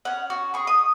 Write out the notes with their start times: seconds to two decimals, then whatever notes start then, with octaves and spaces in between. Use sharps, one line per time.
0.05 C#4 F#5
0.30 F#4
0.54 G#4 C#6
0.67 D#6